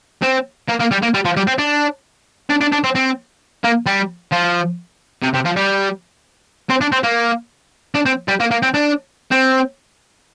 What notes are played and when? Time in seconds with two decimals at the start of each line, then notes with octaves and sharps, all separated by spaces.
0.23 C4
0.68 A#3
0.80 A#3
0.91 G3
1.02 A#3
1.14 G3
1.25 F3
1.37 G3
1.48 C4
1.59 D4
2.50 D4
2.61 D4
2.72 D4
2.84 C4
2.95 C4
3.64 A#3
3.86 G3
4.32 F3
5.22 C3
5.34 C3
5.45 F3
5.56 G3
6.70 C4
6.81 D4
6.92 C4
7.04 A#3
7.95 D4
8.06 C4
8.28 G3
8.40 A#3
8.51 A#3
8.63 C4
8.74 D4
9.31 C4